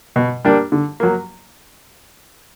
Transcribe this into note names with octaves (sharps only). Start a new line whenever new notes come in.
B2
G3 A#3 D4
D3
F#3 A#3